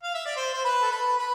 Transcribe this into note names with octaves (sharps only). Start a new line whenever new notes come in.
F5
E5
D5
C5
C5
B4
A4
B4
B4